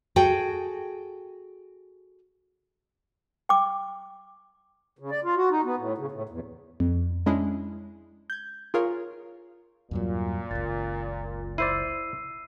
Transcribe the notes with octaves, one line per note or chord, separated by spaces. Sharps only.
F#4 G#4 A4 G5
G5 D6
C#3
D5
F4
F#4
D#4
B3
A2
C#3
A2
E2
F2
G#3 C#4 D4 E4 G#4
G6 G#6
F4 G#4 A#4 C#5 F5
E2 G2 A#2 F#3
F#1 C#2 A6
E4 C5 D5 E6 C7 D#7